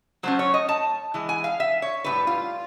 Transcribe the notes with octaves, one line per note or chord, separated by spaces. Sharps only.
F#3 A3 C#4 C5
C#5
D#5
A5
E3 G#3
G#5
F5
E5
C#5
A2 E3 G3 B4
F4